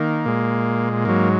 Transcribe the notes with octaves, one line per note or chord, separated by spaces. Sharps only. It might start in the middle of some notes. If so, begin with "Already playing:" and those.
Already playing: D#3 A#3
A#2 G#3
G#2 F#3 A#3